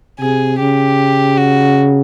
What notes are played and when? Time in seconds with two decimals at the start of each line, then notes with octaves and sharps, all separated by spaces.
0.20 C3 G#4
0.59 C#3 G4
1.37 F#4